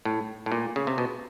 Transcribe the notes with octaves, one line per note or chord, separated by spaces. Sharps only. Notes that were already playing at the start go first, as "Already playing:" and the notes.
A2
A2
A#2
C#3
C3
B2